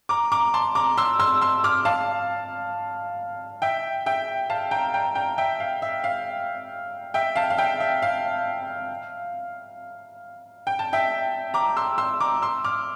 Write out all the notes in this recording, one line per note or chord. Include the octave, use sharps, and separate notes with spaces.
A#5 D6
A#5 D6
A5 C6
A#5 D6
C6 E6
C6 E6
C6 E6
D6 F6
F5 A5
E5 G5
E5 G5
F5 A5
G5 A#5
G5 A#5
G5 A#5
E5 G5
F5
E5
F5
E5 G5
F5 A5
F5
E5 G5
E5
F5
G5
A5
E5 G5
A#5 D6
C6 E6
C6 E6
A#5 D6
C6 E6
D6 F6